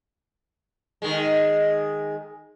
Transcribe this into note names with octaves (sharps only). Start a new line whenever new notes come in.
D#3 G#3